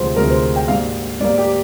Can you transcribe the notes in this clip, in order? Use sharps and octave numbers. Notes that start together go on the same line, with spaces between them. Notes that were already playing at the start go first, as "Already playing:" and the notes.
Already playing: D2 C3 F3 G#3 C5
D2 C3 F3 G#3 A#4
C5
G5
G#2 G3 A#3 F5
G#2 G3 A#3 D5
G4